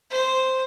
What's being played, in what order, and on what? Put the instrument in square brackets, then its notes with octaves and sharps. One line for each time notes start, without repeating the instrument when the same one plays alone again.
[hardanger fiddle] C5